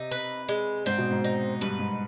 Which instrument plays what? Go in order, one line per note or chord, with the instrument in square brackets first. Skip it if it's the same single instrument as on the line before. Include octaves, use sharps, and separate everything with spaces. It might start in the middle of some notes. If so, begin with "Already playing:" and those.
Already playing: [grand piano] C3 [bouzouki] D#4
[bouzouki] B4
G#3
[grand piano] G#2 [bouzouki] C4
[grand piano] B2
G#2
[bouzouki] D#4
[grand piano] G2 [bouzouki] B4
[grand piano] G#2